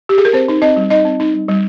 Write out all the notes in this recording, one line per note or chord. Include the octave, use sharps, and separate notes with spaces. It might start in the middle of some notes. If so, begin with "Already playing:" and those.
G4
G#4
A#4
C4 C5
D#4
C4 D#5
G3
D#4 D#5
C4
D#4
G3
G3